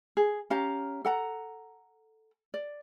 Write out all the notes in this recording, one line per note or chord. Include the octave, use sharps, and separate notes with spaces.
G#4
C#4 G4 F5 A#5
A4 F#5 A#5
D5